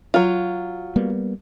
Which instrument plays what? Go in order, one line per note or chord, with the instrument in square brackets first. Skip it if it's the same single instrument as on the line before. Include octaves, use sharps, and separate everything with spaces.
[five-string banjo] F#3 F4
[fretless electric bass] G3 A#3 B3